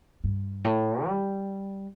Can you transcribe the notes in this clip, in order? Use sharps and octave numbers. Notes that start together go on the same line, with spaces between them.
G2
A2
G3